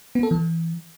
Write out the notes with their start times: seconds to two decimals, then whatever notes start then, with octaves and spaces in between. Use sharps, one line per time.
0.15 B3
0.23 A4
0.31 E3